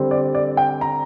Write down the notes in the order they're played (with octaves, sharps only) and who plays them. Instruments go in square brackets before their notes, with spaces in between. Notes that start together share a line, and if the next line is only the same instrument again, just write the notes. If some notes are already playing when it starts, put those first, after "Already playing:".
Already playing: [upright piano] D3 G3 C4
D5
D5
G5
A#5